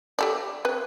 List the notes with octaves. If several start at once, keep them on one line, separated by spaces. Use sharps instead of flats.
G4 A4 D5
C4 B4